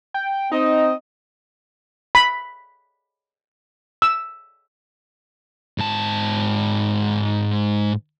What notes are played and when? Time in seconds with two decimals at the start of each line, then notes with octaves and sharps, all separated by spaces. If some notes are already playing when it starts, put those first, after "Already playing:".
0.14 G5
0.52 C4 D#4 D#5
2.15 B5
4.02 E6
5.78 G#2 A5